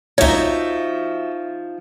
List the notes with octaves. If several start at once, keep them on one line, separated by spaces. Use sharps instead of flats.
C#2 F3 D#4 F#4 C#5 E5